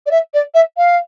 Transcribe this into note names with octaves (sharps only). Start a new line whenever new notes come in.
D5
E5
D5
E5
F5